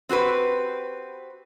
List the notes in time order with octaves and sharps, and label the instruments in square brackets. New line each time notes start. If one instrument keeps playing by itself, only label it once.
[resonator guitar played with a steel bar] C4 F#4 G4 B4